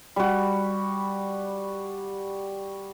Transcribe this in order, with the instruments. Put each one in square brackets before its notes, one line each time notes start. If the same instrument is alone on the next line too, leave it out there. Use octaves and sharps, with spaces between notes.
[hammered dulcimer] G3 F#4